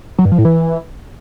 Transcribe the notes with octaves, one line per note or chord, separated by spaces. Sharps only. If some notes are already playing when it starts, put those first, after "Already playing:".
F#3
G2
F3
A2
E3